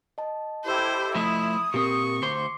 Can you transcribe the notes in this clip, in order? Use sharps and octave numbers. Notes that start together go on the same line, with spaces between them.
D#5 A5
E4 G4 A4 C5
F3 A3 E4 D#6
A#2 C4 G4 A#4 C#6
D2 C5 C6 D6 C7